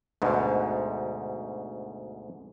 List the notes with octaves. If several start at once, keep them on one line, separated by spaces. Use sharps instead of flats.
D2 G#2 B2